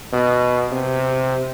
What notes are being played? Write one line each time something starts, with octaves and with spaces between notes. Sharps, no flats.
B2
C3